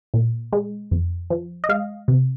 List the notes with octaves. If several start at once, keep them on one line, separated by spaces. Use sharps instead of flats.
A#2
G#3
F2
F3
D#5
G#3 F5
C3